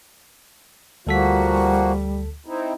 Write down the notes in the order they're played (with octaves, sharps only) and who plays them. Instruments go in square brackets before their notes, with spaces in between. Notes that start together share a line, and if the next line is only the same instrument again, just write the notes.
[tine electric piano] D2 A4 B6 [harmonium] F3 A#3 F#4 [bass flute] G3
[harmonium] C4 D#4 E4